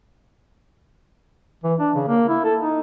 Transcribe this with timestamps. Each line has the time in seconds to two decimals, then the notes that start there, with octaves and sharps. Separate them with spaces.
1.64 E3
1.80 D4
1.95 C#3
2.08 A#3
2.29 E4
2.44 A4
2.60 D#4